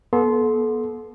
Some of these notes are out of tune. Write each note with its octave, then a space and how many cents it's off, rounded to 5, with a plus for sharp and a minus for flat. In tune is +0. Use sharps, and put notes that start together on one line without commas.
B3 -40 A4 -30 C6 +0